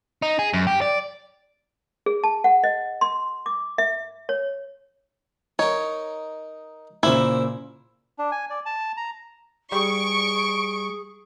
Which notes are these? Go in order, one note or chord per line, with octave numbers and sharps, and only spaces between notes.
D#4
G#4
F#2
G4
D5
G#4
A5
F#5
D#5
C6
D6
E5
C#5
D#4 A#4 C#5
A#2 C#3 A#3 E4 C5 E5
D4
G#5
D5
A5
A#5
G3 G#4 C#6 D7